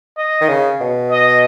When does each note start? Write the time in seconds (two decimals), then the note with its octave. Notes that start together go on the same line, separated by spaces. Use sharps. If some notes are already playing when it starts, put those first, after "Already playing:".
0.18 D#5
0.41 D#3
0.49 C#3
0.81 B2
1.11 D#5